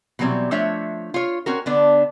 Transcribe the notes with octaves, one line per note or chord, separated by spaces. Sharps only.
B2 E3 F#3 G3 A#3 C4
F3 A3 D4 C#5 E5
F4 C#5
C4 C#4 F#4 A#4
D3 B3 D4